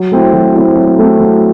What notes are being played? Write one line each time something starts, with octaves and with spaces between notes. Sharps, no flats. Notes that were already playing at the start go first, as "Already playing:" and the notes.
Already playing: F#3
A3 C4 E4
F#3
A3 C4 E4
F#3
A3 C4 E4
F#3